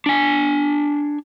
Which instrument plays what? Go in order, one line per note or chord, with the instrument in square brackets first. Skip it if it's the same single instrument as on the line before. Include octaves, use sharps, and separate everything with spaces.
[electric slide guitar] D4 G#5